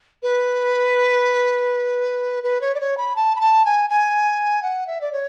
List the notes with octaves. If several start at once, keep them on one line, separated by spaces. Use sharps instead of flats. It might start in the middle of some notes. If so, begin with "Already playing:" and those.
B4
B4
C#5
D5
C#5
B5
A5
B5
A5
G#5
G#5
F#5
E5
D5
C#5